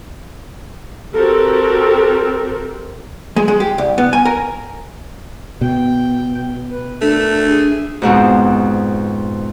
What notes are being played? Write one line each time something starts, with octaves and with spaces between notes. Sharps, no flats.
C4 F#4 G4 A4 A#4
G#3
G#3
G4
C2
B3
G#5
A#4
B2 G5
B4
A3 D4 A#4
G#4 E5
F2 G#2 B2 C4